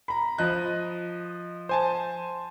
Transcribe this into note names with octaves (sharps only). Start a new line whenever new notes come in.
A#5 B5
F3 D#5 F#6
C5 G#5 A5